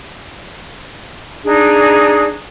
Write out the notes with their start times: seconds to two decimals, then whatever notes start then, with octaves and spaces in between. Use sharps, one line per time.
1.45 D4 D#4 G#4